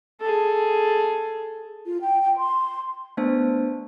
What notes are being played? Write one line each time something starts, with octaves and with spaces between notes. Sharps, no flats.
G#4 A4
F4
G5
G5
C6
A3 B3 D4 C5 A5